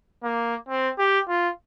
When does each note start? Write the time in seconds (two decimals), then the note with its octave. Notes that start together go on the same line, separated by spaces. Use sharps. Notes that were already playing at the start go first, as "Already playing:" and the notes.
0.24 A#3
0.69 C4
0.99 G4
1.29 F4